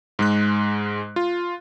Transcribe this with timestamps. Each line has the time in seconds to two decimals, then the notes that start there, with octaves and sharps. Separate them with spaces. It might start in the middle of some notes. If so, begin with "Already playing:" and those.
0.19 G#2 G#3 F#6
1.16 F4